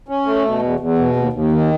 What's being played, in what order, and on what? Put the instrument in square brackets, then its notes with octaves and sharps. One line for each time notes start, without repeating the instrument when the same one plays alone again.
[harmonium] C#4
A3
B2
E2
E2
B2
D#2
D#2
D#3